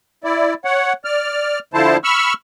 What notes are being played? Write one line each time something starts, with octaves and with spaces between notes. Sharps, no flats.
E4 D5
C#5 F#5
D5 F6
D3 F3 E4 C5 A5
B5 C#6 E6 F6